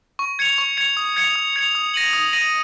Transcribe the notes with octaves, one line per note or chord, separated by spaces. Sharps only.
C#6
G#6 C#7 F7
C#6
G#6 C#7 F7
D#6
G#6 C#7 F7
D#6
G#6 C#7 F7
D#6
A#6 D#7 F#7
D#6
A#6 D#7 F#7